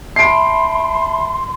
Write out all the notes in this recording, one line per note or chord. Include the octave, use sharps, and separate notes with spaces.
E5 A5 B5 C6 C7 D7